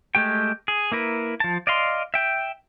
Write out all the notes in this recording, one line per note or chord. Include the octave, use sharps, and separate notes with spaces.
G#3 A3 G4 G5
G#4
A#3 E4 A#4 B4
F3 A5
D5 D#5 F5 C6
E5 G5